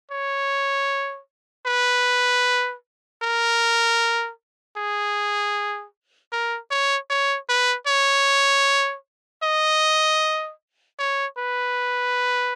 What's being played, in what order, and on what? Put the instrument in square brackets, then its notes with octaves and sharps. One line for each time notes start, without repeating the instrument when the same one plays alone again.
[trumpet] C#5
B4
A#4
G#4
A#4
C#5
C#5
B4
C#5
D#5
C#5
B4